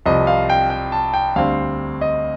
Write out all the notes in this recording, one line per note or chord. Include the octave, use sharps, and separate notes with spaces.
C2 C3 F3 C4 D#5
F5
G5
G5
A5
G5
D2 D3 G3 C4 F5
D#5